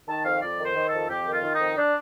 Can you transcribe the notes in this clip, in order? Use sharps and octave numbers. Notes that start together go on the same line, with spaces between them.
D#3 A5
F2 F5
F2 D5
D#3
C5
D#3
F2 A4
F2 G4
D#3
F4
D#3
D#4
F2
D4